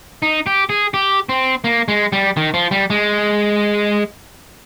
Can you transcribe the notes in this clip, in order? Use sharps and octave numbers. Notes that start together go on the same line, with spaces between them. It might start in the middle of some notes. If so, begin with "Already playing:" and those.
D#4
G4
G#4
G4
C4
A#3
G#3
G3
D#3
F3
G3
G#3